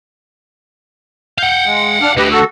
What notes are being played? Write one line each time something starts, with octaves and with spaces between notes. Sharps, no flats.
F5 F#5 G6
G#3
D4 F6
D3 A3 G4 B4 D#5
F#4 A4